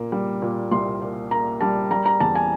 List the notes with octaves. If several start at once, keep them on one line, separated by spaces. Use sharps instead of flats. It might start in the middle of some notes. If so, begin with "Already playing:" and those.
Already playing: A#2 A#3
G3
A#2
C2 C6
A#3
A#3 A#5
G3 A5
G3 A#5
A#5
E2 A5
G#5